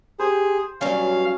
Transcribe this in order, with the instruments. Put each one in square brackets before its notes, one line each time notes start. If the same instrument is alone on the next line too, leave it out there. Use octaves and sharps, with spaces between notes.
[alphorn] G4 [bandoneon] G#4 [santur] C5
[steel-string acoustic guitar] G2 F#3 [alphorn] B2 [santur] C#4 [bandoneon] F5